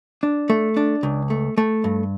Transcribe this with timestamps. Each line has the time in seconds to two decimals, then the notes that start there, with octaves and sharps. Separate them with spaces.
0.23 D4
0.50 A3
0.77 D4
1.03 C#2
1.30 A3
1.58 A3
1.84 G2